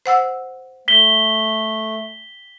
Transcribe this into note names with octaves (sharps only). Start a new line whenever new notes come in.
C5 F#5 E6
A3 B6 G7